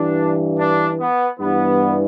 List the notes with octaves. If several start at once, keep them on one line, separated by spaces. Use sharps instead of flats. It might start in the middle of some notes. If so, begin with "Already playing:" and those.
Already playing: G2 E3 D4
D4
B3
G2 E3 B3